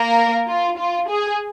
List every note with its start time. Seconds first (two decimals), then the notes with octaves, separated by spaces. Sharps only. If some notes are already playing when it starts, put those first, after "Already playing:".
Already playing: A#3 A#4
0.48 F4
0.78 F4
1.09 G#4